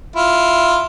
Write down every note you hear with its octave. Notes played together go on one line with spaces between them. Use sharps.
E4 F4